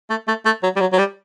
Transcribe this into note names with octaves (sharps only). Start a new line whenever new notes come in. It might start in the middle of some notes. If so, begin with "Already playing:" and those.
A3
A3
A3
F#3
G3
F#3
F#3
G3